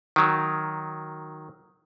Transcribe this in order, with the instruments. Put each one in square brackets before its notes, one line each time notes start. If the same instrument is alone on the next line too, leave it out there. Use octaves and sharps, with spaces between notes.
[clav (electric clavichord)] D#3 F#3